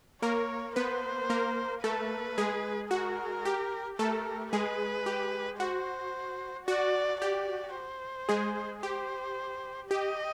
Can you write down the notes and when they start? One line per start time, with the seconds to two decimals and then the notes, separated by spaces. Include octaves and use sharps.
0.22 A#3 A#4 C#5
0.76 B3 B4 C5
1.30 A#3 A#4
1.83 A3 A4 B4
2.38 G#3 G#4
2.91 F#4 A#4
3.45 G4
3.99 A3 A4 A#4
4.53 G#3 G#4 B4
5.06 G4
5.60 F#4 C5
6.67 F#4 D5
7.21 G4 D5
7.75 C5
8.29 G#3 G#4
8.83 G4 C5
9.91 G4 D#5